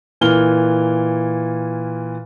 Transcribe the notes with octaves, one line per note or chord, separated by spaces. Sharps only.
A#2 E3 F6 G7